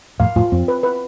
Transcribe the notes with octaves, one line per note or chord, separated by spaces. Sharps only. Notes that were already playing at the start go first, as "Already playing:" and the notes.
F2 A2 F5
F2 A2 F4
F2 C4
B4
B4